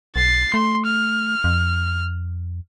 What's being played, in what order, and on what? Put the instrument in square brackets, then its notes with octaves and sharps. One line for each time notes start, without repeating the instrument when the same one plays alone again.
[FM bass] B1 [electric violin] A6 C7
[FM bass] A3 [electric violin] C6
[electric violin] F6
[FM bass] F2